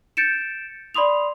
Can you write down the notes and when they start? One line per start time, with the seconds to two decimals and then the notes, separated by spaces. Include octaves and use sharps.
0.17 G6 A6 C#7 D7 E7
0.95 D5 B5 C6 D#6 F7